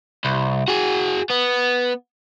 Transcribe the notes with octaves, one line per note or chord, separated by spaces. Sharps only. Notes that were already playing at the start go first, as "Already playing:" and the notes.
C2
F#4 G#4
B3